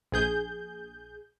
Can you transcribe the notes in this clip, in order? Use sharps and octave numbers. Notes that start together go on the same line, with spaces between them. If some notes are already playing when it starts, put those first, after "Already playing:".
A#1 G#4 G6